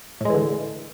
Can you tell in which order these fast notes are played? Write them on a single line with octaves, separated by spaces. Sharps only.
A2 G#3 E3 D3